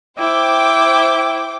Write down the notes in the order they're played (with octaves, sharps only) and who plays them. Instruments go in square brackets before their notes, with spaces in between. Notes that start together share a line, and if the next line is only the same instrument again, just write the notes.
[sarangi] E4 [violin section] C5 G5 D6